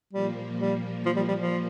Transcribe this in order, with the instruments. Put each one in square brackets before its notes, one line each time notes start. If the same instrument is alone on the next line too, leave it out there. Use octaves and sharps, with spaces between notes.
[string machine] A#2 F3 A#3 [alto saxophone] G3
[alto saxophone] G3
F3
G3
G3
F3